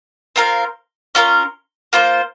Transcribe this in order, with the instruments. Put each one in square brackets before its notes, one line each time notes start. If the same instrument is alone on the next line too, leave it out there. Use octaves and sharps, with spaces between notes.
[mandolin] C4 F4 A#4 F5
C#4 F4 A#4
A#3 F4 C5